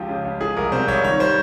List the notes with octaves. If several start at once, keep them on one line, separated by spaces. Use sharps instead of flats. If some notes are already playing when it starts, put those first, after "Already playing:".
Already playing: C#2 F3 G4
C#3
C#2
F3 G#4
C2 A#4
C3 C5
C2 C#5
D#3 C#5
G3 C5